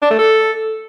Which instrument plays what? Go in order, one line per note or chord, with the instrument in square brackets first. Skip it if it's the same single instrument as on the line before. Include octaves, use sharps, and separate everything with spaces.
[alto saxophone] D4
A3
A4